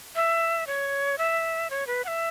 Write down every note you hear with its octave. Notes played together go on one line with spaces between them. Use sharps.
E5
C#5
E5
C#5
B4
F#5
E5